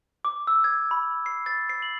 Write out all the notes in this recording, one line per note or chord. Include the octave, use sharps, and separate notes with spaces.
D6
E6
G#6
B5
C7
A6
C7
F#7